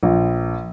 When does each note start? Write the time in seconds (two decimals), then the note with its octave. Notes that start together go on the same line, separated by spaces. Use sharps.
0.03 A#1